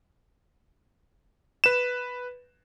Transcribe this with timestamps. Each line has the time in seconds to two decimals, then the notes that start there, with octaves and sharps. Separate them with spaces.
1.64 B4 E7